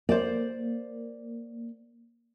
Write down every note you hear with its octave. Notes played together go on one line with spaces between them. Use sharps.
A#3 C5 D5